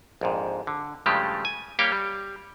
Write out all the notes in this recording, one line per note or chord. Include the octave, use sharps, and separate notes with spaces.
A#1 F2 G#2
D3
G2 C#3 F3 G#3 A3 G4
G#5
G3 A#3 G4 C#5 F5 G5
G3